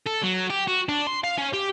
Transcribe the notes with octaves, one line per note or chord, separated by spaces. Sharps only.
A4
F#3
G4
F#4
D4
C6
F5
C#4
G4